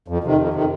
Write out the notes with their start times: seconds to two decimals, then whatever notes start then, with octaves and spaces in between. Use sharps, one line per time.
0.08 F2
0.24 C3 D#3
0.39 F2
0.53 C3 D#3